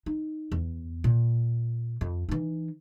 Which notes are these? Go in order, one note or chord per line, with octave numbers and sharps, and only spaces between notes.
D#4
E2
A#2
F2
E3 D#4